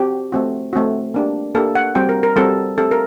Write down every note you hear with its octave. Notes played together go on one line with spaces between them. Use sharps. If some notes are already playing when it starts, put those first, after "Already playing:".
Already playing: C4 F#4 G4
A3 C4 F#4
A3 C4 F#4
A#3 D4 G4
A#3 D4 G4 A4
F#5
G3 C4 F#4 G5
A#4
A#4
G3 C4 F#4 A4
A3 C4 G4 A4
A#4